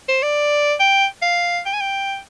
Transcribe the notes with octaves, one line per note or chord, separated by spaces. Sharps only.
C5
D5
G5
F5
G5
G#5
G5